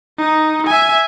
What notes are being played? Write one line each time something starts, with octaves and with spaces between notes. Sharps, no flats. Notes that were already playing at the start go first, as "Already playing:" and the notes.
D#4
E5 G#5